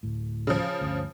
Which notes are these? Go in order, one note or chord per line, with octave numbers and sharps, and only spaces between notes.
D1 A2
C#3 F3
G1 D2